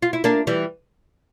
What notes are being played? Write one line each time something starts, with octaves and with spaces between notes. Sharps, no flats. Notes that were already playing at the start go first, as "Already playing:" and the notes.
F4
E4
A#3 D4
E3 G3